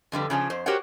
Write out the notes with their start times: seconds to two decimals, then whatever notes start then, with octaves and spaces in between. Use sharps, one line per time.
0.12 F2 D3 G3 B4
0.30 C#3 F3 C#4 D4
0.50 F2 C5
0.66 F#4 G4 A#4 C5 C#5 F#5